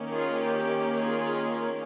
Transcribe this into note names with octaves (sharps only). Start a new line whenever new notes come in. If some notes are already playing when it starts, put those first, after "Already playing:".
Already playing: D#3 A#3 C#4
F4 G#4
G4
F4 G#4